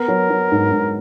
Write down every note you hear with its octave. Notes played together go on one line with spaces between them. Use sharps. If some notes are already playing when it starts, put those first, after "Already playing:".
Already playing: B3 A#4
F#3
F#3
G#2
G#2